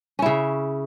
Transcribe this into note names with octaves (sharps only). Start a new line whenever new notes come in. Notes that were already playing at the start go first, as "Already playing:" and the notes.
C#3 C#4 E4